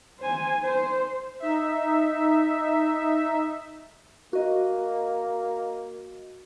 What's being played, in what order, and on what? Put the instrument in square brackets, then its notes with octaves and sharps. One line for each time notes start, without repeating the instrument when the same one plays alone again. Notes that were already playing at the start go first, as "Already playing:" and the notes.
[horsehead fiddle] C5 G#5
C5
[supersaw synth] D#4 E5
[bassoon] A#3 [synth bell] F#4 D#5